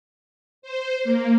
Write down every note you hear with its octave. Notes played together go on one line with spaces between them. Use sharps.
C5
A#3